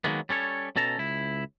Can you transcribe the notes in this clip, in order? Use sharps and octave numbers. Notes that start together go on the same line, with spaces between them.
D#3 F3 F#3 G#3 A#3 B3
G3 C#4 A4 C#5
B2 C#4 A4 A5 A#5
C#2 E4